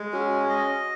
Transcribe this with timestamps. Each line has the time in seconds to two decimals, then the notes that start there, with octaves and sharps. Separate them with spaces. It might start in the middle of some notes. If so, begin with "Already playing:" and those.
Already playing: G#3
0.13 C#4 F#4
0.49 D#5